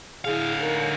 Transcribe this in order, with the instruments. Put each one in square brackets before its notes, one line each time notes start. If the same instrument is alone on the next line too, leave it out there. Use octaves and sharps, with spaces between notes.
[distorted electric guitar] D3 F5 [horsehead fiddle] E4 G#4
[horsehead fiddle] D#4 A#4